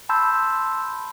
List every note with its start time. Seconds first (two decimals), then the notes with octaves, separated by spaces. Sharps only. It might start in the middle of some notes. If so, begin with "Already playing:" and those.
0.09 A5 B5 C6 E6 G6